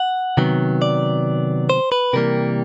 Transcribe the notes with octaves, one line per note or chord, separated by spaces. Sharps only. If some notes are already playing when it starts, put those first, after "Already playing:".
Already playing: F#5
C3 D#3 F#3 B3
D5
C5
B4
C3 E3 G3 A#3 A#4